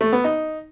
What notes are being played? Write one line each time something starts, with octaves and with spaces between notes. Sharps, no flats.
A3
B3
D#4